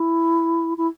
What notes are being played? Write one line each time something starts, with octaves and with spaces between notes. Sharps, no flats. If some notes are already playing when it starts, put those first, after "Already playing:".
Already playing: E4
E4